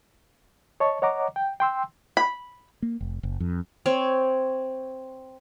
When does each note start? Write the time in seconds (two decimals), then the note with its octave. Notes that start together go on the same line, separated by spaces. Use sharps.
0.80 C#5 D#5 A5 C#6
1.02 C#5 D#5 F#5 A#5 D6
1.36 G5
1.60 G5 C6 E6
2.17 B5
2.82 A#3
3.01 F1
3.23 F#1
3.40 F2
3.86 C4 C#5